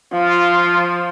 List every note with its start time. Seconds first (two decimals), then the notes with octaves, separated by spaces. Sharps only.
0.12 F3 F4